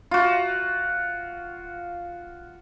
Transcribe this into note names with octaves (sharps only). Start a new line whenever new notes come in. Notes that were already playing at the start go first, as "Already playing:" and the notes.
F4 F#4